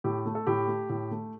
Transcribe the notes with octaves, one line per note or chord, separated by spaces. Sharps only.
A2 G4
A3
A4
A2 G4
A3
A2
A3